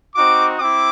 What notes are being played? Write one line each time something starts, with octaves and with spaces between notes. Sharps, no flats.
C4 D#4 F#4 D6
C4 E4 D6